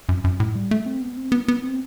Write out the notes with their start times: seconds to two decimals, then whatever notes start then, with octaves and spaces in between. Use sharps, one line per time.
0.09 F#2
0.24 F#2
0.40 A2
0.55 G3
0.71 A3
0.86 C4
1.01 B3
1.17 C4
1.32 B3
1.48 B3
1.64 C4